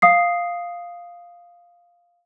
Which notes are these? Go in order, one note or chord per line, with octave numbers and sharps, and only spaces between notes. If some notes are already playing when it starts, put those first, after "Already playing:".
F5 D#6 C7